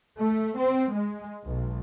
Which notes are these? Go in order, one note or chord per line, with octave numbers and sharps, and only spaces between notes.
A3
C4
G#3
B1